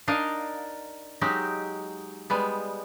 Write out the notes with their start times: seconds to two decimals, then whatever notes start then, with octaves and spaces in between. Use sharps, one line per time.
0.08 D4 D#4 A#4 D#5 F5
1.21 F#3 G#3 D#4 G4
2.30 G3 G#3 B3